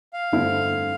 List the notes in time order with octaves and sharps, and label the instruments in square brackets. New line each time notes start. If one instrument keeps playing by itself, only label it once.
[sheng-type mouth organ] F5
[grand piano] G2 D3 A3 C4 E4